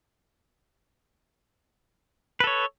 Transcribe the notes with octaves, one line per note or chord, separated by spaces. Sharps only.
A4 B4 C#5